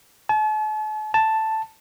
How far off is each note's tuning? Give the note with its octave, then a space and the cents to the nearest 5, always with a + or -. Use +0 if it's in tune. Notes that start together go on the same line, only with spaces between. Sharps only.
A5 -40
A5 +5